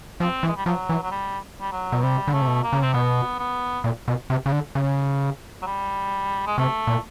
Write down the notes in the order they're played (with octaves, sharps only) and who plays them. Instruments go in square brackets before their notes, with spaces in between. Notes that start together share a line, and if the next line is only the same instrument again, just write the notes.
[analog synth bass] F3 [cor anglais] C4
[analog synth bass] E3
[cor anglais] G#3
G3
[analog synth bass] F3 [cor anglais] F#3
[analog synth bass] E3
[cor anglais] F#3
G3
G3
F#3
[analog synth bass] B2
[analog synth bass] C3 [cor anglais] G3
[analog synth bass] D3
[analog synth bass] C#3 [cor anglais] A3
[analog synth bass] C3
B2
[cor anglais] A#3
[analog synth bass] C#3
[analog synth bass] C3 [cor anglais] C4
[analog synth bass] B2 [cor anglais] B3
[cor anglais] B3
[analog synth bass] A#2
B2
C3
C#3
D3
C#3
[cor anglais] F#3
G3
G#3
[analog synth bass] C3 [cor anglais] A3
[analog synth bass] A#2